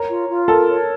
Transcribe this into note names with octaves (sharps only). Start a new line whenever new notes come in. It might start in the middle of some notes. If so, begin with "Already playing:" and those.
Already playing: A#4 C#5
F4
F4
A4 A#4
C#5